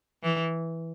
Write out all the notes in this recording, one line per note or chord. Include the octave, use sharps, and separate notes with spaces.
E3